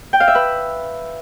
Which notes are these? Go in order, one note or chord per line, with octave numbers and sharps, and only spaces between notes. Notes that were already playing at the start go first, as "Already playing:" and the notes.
G5
F5
E5
B4